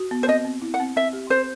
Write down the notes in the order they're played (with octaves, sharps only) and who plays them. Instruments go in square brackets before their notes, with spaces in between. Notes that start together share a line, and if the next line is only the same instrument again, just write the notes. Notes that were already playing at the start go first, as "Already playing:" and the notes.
Already playing: [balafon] F#4
B3
[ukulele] C5
[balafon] C4 [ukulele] D#5
[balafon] C4
E4
[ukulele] F#5
[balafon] C4
[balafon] C4 [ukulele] E5
[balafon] G4
[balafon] C4 [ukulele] C5